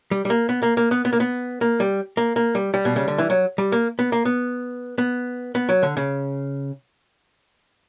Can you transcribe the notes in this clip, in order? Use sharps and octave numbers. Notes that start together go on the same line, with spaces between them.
G3
G3
A#3
B3
A#3
A#3
B3
B3
A#3
B3
A#3
G3
A#3
A#3
G3
G3
B2
C#3
D3
E3
F#3
G3
A#3
B3
A#3
B3
B3
B3
F#3
D3
C#3